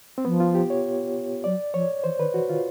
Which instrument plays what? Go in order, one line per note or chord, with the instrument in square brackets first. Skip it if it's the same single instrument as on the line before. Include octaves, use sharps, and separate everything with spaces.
[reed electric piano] C4
[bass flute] F3 [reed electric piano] B3
[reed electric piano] F4
G4
C#5
[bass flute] F#3 [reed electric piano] D5
[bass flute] F3 [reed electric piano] C#5
[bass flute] E3 [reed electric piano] C5
[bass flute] D#3 [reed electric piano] B4
[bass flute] E3 [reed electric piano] F#4
[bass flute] D#3 [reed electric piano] F4